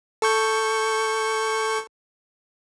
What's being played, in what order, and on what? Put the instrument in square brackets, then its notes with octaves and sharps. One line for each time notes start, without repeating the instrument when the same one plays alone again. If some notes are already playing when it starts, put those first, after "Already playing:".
[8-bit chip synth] A4 C#6 G6